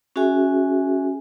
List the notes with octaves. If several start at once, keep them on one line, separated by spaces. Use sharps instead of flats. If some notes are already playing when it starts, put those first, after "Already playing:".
C#4 F#4 G#4 E5 G#5